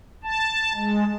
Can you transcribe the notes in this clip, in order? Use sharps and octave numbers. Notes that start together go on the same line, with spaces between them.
A5
G#3